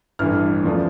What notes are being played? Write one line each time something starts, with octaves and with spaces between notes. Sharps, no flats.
A1 G2 E3 A3 F6
E2 C#3 F3 A3 D4